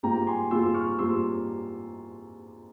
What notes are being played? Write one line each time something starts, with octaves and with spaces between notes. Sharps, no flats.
G#2 G3 A#3 F4 G5 A#5
G#5 C6
G#2 G3 A#3 F4 C6 E6
C#6 F6
G#2 G3 A#3 F4 C6 E6